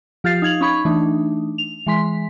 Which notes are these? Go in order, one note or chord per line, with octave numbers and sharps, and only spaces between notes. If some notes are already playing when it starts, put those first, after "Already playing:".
F3 F4 G4 F5 A6 C7
D#4 F5 G#6 F7 F#7
C#4 D#4 B5 C#6 G#6
E3 A3 D4 D#4
F7
E3 G#3 C6 B6